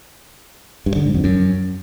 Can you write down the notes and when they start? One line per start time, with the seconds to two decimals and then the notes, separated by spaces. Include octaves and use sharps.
0.86 G2
0.96 D3
1.05 G#2
1.14 F2
1.24 F#2